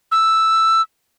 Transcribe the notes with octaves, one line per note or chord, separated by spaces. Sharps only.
E6